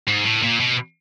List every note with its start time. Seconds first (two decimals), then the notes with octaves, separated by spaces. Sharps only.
0.08 G#2
0.25 A2
0.43 A#2
0.60 B2